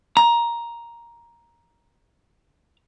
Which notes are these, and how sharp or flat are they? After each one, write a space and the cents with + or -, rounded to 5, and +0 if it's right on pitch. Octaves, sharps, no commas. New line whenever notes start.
A#5 +10